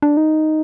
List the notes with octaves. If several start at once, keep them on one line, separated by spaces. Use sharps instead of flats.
D4
D#4